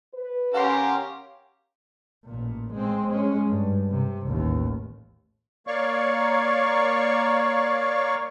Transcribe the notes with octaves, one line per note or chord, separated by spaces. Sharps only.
B4
C#4 G4 A#4 F5 F#5 C6
A1 A#2
G#3 C4
G#3 C#4
G2
C3
A1 D#2
A#3 C#5 D5 F5 C#6